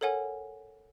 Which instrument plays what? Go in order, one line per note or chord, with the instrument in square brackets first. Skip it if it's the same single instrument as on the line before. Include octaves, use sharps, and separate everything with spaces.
[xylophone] A4 A#4 C#5 F#5 G#5